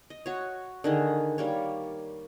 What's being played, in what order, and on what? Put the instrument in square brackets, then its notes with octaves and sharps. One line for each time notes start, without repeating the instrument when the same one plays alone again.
[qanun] D#5
F#4 C#5
D3 D#3 G#4
G3 A#3 C#5